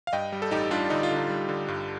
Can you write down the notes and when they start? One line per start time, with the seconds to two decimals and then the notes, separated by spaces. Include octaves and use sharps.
0.07 F5
0.13 G2 D#5 G5
0.32 G3
0.42 A4
0.51 A1 D#4 G4
0.71 G3 D4 F4
0.90 D3 D#4
1.03 F4
1.11 D3
1.16 D#4
1.30 G3
1.49 D3
1.68 G2